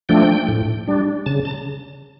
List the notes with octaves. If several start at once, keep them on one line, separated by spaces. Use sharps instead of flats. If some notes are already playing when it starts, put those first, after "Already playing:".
F3 A3 D4 G5
A2
G3 D4
C#3 A5
A5